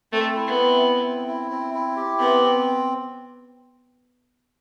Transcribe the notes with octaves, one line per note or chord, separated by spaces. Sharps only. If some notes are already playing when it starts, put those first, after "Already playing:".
A3 C4
E4
B3
C4
E4
C4
E4
C4
E4
G4
B3 C4
C4